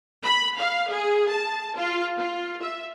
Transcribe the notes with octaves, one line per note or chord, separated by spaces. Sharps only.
B5
F5
G#4
A5
F4
F4
E5